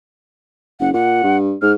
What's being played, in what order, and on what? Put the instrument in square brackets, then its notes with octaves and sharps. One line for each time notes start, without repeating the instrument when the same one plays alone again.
[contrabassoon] F#1 [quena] F#5
[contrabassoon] A#2 [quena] F#5
[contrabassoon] G2
[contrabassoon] G#2 [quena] F6